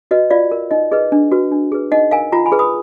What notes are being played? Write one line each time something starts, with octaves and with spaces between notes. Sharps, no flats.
F#4 B4 D#5
F4 D5 F5
A#4
D#4 D#5
G#4 B4 D#5
D4
F#4 B4
D4
G#4 B4
D#4 D#5 F#5
A#4 F5 G#5
F4 F#5 A#5
G#5 B5
G#4 B4
B5 D#6